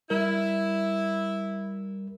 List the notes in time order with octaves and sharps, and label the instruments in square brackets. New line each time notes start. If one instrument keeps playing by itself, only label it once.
[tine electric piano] G3 A#4 [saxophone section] E4